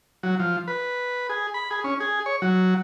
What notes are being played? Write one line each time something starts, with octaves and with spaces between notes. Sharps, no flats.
F#3
F3
B4
G#4
B5
G#4
C#4
G#4
C#5
F#3